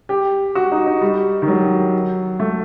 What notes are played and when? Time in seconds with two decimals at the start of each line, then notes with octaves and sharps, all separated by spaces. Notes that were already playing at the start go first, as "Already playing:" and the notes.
0.09 G4
0.55 F#4
0.71 D#4
0.86 D#4
1.01 G3
1.42 D#3
1.48 F#3
2.40 A3